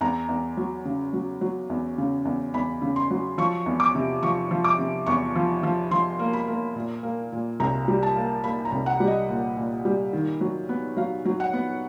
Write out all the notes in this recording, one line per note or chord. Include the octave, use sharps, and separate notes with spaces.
E2 A#5
E2
F#3
C#3
F#3
F#3
E2
C#3
E2
E2 B5
C#3
C6
F#3
F3 C#6
E2
D6
C3
F3 C#6
F3
D6
C3
E2 C#6
F3
F3
F3 C6
A#3
B5
A#3
A#2
A#3
A#2
C2 A#5
G3
A5
A#3
A#3 B5
A#5
C2
F#5
G3
D#5
A#2
A#2
G3
D#3
F#3
B3
F#3 F5
F#3
F#5
B3